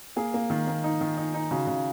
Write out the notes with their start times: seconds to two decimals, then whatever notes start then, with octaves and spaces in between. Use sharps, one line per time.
0.16 A#3 G#4
0.34 A#3
0.50 D#3
0.67 A#3
0.84 D#4
1.01 D#3
1.17 D#4
1.34 D#4
1.50 C#3 F#4
1.67 C#3